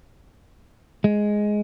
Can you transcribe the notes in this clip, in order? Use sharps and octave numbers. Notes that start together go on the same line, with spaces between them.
G#3